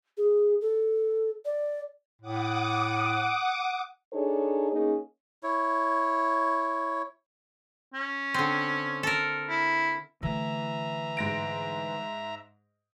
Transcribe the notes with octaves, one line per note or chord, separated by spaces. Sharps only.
G#4
A4
D5
A2 F#5 D6 D#6
D4 D#4 G#4 A4 C#5
A#3 C#4 D#4 G#4
E4 C#5
C#4
D3 C4
A4 A#4
E4
D3 E3 A3 E5 A#5
G#2 A#6 D7